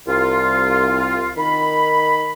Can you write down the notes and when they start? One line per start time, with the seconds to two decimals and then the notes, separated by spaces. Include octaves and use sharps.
0.07 C2 F4
1.37 D#3 B5